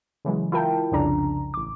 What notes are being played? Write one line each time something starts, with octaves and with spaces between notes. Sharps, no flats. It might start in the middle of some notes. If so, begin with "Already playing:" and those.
C#3 E3 F#3 G#3
E4 F4 A#4 G5 A5
C2 F2 C#3 D4 A#5
A1 D6